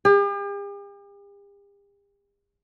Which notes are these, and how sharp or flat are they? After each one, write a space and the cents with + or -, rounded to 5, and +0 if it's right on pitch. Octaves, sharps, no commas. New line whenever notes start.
G4 +45